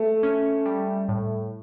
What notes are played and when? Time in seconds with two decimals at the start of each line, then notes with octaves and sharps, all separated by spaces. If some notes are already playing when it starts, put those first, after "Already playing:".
Already playing: A3
0.23 C#4
0.66 G3
1.09 A2